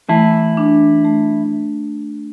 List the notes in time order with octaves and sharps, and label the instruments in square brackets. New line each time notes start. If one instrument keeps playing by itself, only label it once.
[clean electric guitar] E3 E4 [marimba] A3
[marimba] D4
A3